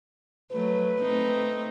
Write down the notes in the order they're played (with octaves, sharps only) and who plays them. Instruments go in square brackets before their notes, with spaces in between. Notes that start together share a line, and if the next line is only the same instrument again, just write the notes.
[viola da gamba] F#3 A3 [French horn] B4
[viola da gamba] A3 C4 D#4